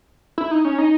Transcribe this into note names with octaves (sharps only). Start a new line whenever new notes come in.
E4
D#4
C#4
D#4